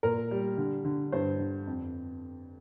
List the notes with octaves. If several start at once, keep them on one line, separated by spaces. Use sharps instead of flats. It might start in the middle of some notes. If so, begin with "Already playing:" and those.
A#2 A#4
G3
D3
D3
G2 C5
D3
F2